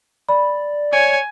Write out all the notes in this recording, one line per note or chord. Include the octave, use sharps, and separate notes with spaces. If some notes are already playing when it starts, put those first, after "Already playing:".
D5 B5
C#5 G#5